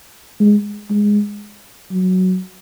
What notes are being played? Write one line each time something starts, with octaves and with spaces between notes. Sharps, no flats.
G#3
G#3
F#3